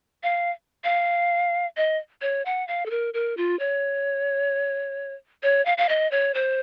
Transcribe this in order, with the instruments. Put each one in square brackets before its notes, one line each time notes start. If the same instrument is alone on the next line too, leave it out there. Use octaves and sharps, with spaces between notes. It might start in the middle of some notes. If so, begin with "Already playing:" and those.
[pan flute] F5
F5
D#5
C#5
F#5
F5
A4
A#4
A#4
F4
C#5
C#5
F5
F5
D#5
C#5
C5